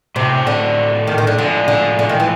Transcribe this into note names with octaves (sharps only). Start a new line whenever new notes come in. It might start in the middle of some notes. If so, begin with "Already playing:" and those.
A2 C3 F#3 A3 D4 G4
D3
D#3
D#3
D3
A2 D3 F3 G#3
D3
D3
D#3
E3